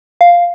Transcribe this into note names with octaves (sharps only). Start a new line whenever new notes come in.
F5